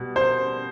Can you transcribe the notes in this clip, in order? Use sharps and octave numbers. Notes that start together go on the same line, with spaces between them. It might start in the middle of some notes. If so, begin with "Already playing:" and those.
Already playing: B2 G3
C5